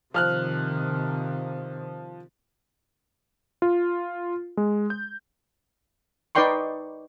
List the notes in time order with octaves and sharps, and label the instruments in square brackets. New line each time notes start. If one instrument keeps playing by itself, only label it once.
[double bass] C3 D#3 [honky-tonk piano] F3 F6 F#6
[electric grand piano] F4
G#3
G6
[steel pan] D#4 B4 D5 G5 C6 C#6